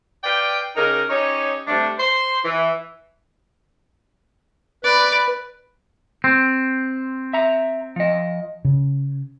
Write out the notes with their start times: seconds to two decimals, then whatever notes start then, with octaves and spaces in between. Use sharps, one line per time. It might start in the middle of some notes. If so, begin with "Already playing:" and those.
0.24 B4 D5 F5 G5
0.76 C#3 D#4 G4 A#4
1.10 C#4 D#4 G4 C#5
1.67 C3 G3 A3 D4
1.99 C5 C6
2.44 E3
4.84 B4 D5
6.24 C4
7.33 E5 A#5
7.96 F3 D#5
8.65 C#3